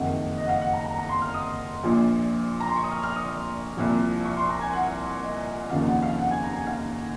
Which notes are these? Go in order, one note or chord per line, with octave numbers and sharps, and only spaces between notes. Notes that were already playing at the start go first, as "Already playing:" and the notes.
Already playing: F#1 F2 D#3 F#5
D#5
F#5
F5
F#5
A#5
A#5
A#5
C6
F6
D#6
A#1 A#2 F3
A#5
C6
C#6
D#6
F6
F6
D#6
C2 A#2 F3
C#6
C6
A#5
G#5
F#5
D#5
F1 D#2 C#3 F3 F5
F#5
F5
F#5
G#5
A#5
G#5
F5